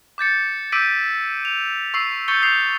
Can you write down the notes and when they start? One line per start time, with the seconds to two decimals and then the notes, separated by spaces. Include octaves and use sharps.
0.18 D6 G6 A6 C#7
0.72 D6 E6 G6 B6 D7 D#7
1.45 F7
1.94 C#6 E6 C7
2.28 C#6 G6 A6 C#7 G7
2.42 D#6 G6 C7 F7